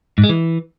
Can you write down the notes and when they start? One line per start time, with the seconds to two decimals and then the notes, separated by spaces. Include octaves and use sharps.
0.18 G#2
0.24 G#3
0.29 E3